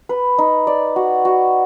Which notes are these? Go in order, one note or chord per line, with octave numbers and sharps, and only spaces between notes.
B4
D#4
D5
F#4
F#4